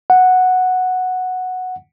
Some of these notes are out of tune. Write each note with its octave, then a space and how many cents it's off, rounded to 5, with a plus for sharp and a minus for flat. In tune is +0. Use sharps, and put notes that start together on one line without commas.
F#5 -5